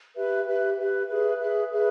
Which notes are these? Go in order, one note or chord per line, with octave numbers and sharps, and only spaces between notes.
G4 B4 E5
G4 B4 E5
G4 B4 E5
G#4 B4 E5
G#4 B4 E5
G#4 B4 E5